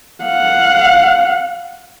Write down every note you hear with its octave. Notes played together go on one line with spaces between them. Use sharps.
F5 F#5